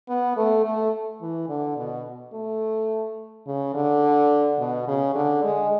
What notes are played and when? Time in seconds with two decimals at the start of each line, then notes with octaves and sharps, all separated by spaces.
0.08 B3
0.37 A3
0.65 A3
1.21 E3
1.49 D3
1.77 B2
2.33 A3
3.47 C#3
3.75 D3
4.59 B2
4.88 C#3
5.15 D3
5.44 G#3